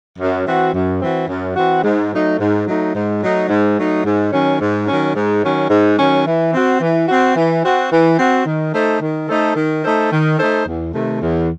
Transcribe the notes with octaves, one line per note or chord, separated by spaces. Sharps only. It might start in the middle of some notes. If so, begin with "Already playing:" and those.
F#2
E3 C4 F#4
F#2
E3 C4 F#4
F#2
E3 C4 F#4
G#2
F#3 A3 D#4
G#2
F#3 A3 D#4
G#2
F#3 A3 D#4
G#2
F#3 A3 D#4
G#2
D#3 F#3 C#4
G#2
D#3 F#3 C#4
G#2
D#3 F#3 C#4
G#2
D#3 F#3 C#4
E3
C4 F#4
E3
C4 F#4
E3
C4 F#4
E3
C4 F#4
D#3
A3 D#4 A4 C5
D#3
A3 D#4 A4 C5
D#3
A3 D#4 A4 C5
D#3
A3 D#4 A4 C5
E2
C3 D#3 A3
E2